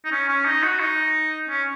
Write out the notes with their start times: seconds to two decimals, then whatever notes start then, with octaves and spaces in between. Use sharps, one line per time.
0.05 D#4
0.12 C#4
0.28 C#4
0.46 D#4
0.63 F#4
0.80 D#4
1.49 C#4